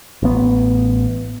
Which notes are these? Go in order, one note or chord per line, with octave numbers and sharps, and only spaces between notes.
A1 B3